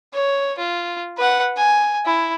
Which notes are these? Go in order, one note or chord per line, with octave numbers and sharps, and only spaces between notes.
C#5
F4
B4 F#5
G#5
E4